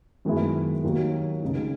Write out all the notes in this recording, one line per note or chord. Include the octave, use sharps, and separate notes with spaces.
F#2 D#3 G#3 B3 E4
D#2 D#3 F#3
C#2 C#3 G#3 D#4